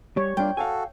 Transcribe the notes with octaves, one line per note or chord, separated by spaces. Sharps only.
G3 G4 C#5
G3 A#3 D4 F4 G5
F#4 A4 F5 G#5